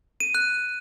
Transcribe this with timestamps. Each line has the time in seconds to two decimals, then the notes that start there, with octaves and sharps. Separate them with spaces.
0.20 D#7
0.35 F#6